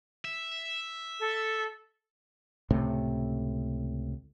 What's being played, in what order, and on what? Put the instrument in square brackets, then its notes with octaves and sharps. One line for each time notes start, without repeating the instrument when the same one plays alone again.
[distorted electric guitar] E5
[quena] A4
[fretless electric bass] C#2 A2 C3 A3